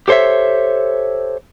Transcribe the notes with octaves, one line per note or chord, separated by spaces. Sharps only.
G4 A4 C5 C#5 E5